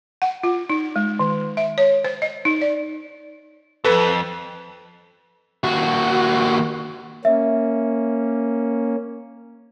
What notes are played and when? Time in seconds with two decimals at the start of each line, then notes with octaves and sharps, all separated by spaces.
0.22 F#5
0.43 F4
0.70 D#4
0.96 G#3
1.19 D#3
1.57 E5
1.78 C#5
2.04 C5
2.22 D#5
2.45 D#4
2.62 D5
3.85 F2 A4 B4
5.64 D#2 F#4
7.25 A#3 C#4 E5